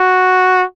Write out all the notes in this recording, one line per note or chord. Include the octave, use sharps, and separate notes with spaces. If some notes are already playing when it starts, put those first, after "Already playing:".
Already playing: F#4